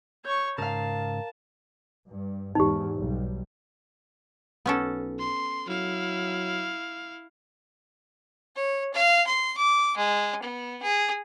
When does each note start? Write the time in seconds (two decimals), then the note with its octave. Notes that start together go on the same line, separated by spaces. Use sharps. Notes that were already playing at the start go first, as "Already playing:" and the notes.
0.25 C#5 C#6 G6
0.58 G#2 C#3 A#4 F5 A5
2.09 G2
2.55 E2 G#2 D#4 G4
2.96 B1 G3
4.66 B1 B3 C#4 A4
5.19 C6
5.67 F#3 E4 F5
8.55 C#5
8.94 F5
9.27 C6
9.57 D6
9.97 G#3
10.42 B3
10.83 G#4